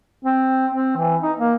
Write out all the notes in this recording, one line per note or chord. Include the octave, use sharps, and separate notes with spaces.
C4
C4
E3
D#4
A#3